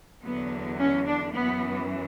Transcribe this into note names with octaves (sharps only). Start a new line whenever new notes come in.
E2 D3 F#3 B3
C#4
D4
F#2 E3 B3